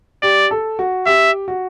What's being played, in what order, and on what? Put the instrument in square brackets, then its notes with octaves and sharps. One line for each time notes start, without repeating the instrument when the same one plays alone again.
[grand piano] G4 [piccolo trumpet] D5
[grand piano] A4
F#4
[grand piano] G4 [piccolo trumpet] E5
[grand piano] F#4